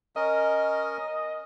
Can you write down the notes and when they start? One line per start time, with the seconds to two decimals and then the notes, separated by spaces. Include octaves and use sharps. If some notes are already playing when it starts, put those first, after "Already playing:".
0.16 C#4 A#4 D#5